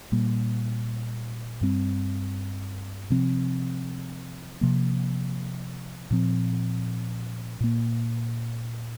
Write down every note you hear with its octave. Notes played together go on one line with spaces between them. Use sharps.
A#2 G3 A#3
G2 G3 C4
C3 F3 C4
C3 F3 A#3
A#2 F3 C4
A#2 A#3